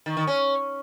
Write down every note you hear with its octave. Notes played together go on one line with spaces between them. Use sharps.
D#3
D#3
C#4